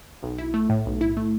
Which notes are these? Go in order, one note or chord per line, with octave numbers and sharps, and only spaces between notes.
B1
E4
A3
A2
B1
E4
A3